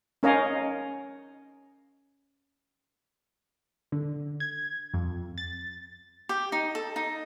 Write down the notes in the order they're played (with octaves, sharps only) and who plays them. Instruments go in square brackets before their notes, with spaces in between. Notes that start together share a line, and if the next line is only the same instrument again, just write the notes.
[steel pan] C#4 D#4 A#4 C#5 D#5 F5
[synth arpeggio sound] D3
G#6
F2
A6
[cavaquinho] G4
D#4
A4
D#4